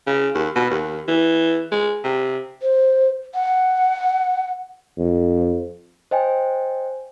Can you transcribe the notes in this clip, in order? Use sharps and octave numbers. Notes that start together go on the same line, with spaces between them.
C#3
D#2
B2
D#2
E3
G#3
C3
C5
F#5
F2
C5 D#5 G5 G#5